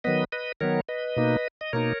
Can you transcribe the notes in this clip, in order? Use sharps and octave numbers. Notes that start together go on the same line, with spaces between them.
D#3 F#3 B3 B4 D#5
B4 D#5
D#3 F#3 B3 A#4 C#5
B4 D#5
B2 A#3 D#4
D#5
B2 A#3 D#4 A#4 C#5